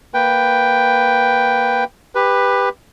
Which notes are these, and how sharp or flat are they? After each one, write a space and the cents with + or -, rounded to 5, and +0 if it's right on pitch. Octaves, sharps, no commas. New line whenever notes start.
A#3 +0 B4 +0 G5 +0
G4 +20 B4 +0